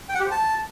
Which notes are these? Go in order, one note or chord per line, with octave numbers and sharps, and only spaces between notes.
G5
F#5
G4
C5
A5